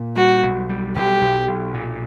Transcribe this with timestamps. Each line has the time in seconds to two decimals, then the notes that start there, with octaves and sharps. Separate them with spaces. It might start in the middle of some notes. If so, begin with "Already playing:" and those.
Already playing: A#2
0.16 G3 F#4
0.43 B1
0.69 G3
0.96 B1 G4
1.21 B1
1.48 B1
1.74 A#2